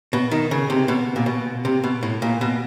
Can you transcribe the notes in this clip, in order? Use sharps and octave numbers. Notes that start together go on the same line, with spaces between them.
B2
D#3
C#3
C3
B2
A#2
B2
C3
B2
A2
A#2
B2